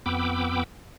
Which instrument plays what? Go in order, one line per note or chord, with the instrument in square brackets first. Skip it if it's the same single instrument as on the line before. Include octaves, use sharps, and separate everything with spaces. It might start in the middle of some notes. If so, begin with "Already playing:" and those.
[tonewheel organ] F2 B3 G5 B5 D6 E6